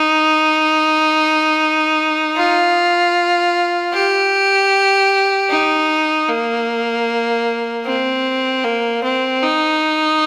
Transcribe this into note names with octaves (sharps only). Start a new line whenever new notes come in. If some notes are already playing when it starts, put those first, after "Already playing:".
Already playing: D#4
F4
G4
D#4
A#3
C4
A#3
C4
D#4